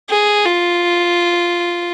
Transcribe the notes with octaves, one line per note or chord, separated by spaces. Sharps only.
G#4
F4